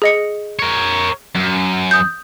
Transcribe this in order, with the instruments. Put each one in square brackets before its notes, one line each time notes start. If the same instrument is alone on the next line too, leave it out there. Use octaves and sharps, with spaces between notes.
[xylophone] G#4 D#5 C#7
[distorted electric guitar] A#4 C#5
F#2
[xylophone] D#6 G6